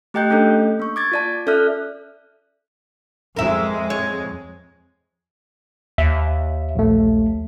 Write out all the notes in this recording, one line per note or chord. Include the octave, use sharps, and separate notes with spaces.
A3 G4 D#5 G5 F#6 G6
A3 C#4 D4 A4 D#5
A#3 C#6
D6 G#6 A6
F4 D5 A5
C#4 A4 D5 E5 F6 F#6
F2 G#3 A#4 E5
C#5
D#2 E5
A#1 A3